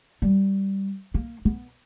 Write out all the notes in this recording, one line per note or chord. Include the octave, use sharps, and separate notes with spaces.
G3
A#3
B3